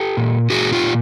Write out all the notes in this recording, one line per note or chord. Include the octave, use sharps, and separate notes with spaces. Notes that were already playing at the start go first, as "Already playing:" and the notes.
Already playing: G4 A4
A#2
A#2 F#4 G#4
F4 G4
A#2